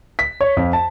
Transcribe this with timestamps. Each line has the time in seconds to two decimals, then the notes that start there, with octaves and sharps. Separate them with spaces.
0.19 B6
0.41 C#5
0.57 F2
0.73 A5